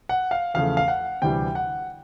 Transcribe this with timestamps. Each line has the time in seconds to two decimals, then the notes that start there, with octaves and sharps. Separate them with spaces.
0.09 F#5
0.31 F5
0.54 E2 C#3 F3 A3 F5
0.77 F5
0.88 F#5
1.22 D2 C3 E3 G3 G5
1.55 F#5